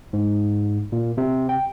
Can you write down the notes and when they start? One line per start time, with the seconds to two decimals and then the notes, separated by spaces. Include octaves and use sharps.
0.13 G#2
0.92 A#2
1.18 C3
1.49 G5